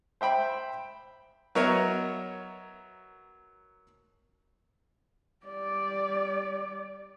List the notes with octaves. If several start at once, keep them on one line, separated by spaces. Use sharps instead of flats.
C5 E5 G5 B5
F#3 B3 A#4 C#5 D#5 E5
G3 D5